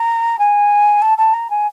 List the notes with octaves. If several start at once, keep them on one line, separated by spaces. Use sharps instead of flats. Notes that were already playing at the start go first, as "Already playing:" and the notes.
Already playing: A#5
G#5
A5
A5
A#5
G#5